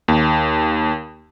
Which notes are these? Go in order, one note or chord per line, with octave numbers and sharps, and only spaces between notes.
D#2